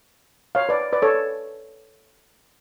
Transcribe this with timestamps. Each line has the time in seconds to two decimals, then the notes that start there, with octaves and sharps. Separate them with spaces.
0.55 C#5 F5
0.69 B4 D5
0.93 B4 D5
1.02 A4 C#5